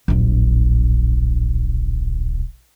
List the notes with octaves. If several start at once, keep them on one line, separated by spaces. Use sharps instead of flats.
D1 A#1